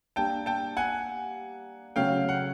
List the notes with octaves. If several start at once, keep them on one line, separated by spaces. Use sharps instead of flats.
G3 A#3 D4 G5 A5
G5 A5
F#5 G#5
C#3 F#3 A3 C#4 F5 G5
F#5